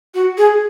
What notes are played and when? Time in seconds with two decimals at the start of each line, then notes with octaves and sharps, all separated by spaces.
0.14 F#4
0.37 G#4